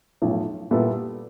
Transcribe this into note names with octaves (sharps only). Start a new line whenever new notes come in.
B1 A2 F3
A#2 G3 B3 E4 A4